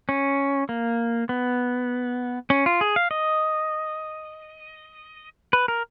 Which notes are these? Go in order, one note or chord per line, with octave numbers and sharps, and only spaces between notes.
C#4
A#3
B3
C#4
F4
G#4
F5
D#5
B4
A#4